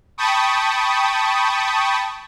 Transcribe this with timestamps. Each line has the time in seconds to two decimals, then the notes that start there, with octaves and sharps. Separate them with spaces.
0.18 G5 A5 B5 C#6 D#6